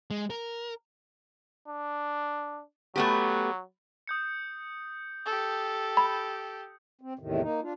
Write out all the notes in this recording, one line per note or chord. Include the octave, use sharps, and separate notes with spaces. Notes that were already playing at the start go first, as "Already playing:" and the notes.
G#3
A#4
D4
F#3 A3 B3 G4
D#6 G6 C#7
G4 A4
B5
C4
E2 A2 C3 D#3
A#3 D#4
D4 F4